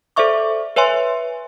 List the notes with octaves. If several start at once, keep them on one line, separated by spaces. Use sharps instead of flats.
A4 C5 D5 E5 C#6 D6
B4 C#5 E5 G#5 C6